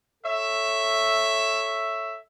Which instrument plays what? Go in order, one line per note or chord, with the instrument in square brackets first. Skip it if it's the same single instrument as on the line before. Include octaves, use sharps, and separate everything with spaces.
[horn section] A4 C#5 E5